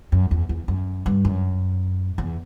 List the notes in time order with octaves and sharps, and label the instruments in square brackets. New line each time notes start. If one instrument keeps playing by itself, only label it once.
[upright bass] F#2
E2
E2
F#2
G2
F#2
E2